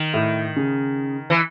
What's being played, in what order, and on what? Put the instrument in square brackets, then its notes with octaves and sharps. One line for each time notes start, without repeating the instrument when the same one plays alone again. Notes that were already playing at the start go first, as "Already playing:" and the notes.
Already playing: [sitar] D#3
[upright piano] A2
C#3
[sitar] E3